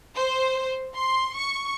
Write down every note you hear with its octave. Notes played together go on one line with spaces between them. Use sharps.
C5
C6
C#6